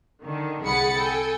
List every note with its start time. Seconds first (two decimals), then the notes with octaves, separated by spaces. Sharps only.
0.22 D3 D#3
0.65 C2 G#4 F#5 B5 A6 C#7
0.98 A4 G5 G#5